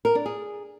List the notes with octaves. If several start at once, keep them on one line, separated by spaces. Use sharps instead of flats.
A#4
D4
G#4